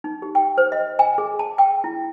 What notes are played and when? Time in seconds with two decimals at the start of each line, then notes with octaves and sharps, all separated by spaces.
0.04 D#4
0.22 G4
0.35 G5
0.58 C5
0.72 D#5
0.99 G#5
1.18 G#4
1.39 A5
1.58 G5
1.84 E4